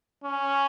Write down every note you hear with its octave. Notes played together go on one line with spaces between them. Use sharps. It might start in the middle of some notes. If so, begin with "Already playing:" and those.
C#4